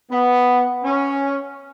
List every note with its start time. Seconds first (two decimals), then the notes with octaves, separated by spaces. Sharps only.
0.11 B3
0.85 C#4